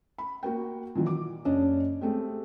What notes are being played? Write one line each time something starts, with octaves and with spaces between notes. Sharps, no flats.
B5
A#3 F#4 A#4 G5
A#2 D#3 E3 F#3
D6
F#1 C#4 D4 D#5
G#3 A3 C4 G4